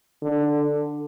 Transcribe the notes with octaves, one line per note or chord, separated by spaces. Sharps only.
D3